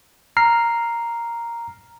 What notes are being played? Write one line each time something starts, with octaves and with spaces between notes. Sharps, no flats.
A#5 F6 C7